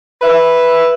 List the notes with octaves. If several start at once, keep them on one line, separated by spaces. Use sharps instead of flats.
B4 E5